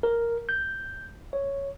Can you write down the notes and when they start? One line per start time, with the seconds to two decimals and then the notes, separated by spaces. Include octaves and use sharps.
0.03 A#4
0.49 G6
1.33 C#5